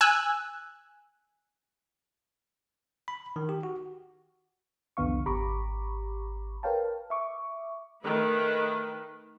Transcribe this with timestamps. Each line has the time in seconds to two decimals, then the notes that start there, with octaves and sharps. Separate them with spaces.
0.01 G#5 E6 F#6
3.08 B5
3.36 D#3
3.49 G4
3.63 F#4
4.97 C2 F2 D3 B3 F5 C#6
5.26 G#1 G4 A#5 B5 C#6 D6
6.63 A#4 B4 C#5 F5 G5 A5
7.10 E5 C#6 D6
8.03 D#3 A3 B4